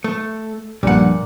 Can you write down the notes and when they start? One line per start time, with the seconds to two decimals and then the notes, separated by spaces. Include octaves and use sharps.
0.04 A3
0.83 A#1 G2 A#2 F#5